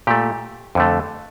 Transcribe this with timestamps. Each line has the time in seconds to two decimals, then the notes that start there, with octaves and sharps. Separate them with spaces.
0.07 A#2 A3 G4
0.75 F2 D3 A3